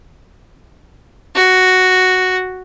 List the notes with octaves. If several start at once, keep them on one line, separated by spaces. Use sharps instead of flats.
F#4